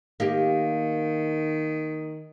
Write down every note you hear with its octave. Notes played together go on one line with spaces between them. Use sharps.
D#3 A#3 G4